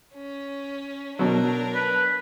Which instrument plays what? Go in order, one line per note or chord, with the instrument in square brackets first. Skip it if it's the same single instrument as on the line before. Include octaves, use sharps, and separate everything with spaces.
[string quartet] C#4
[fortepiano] B2 F#3 [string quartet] D4 A#4
[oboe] B4